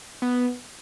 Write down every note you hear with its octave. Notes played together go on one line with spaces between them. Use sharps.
B3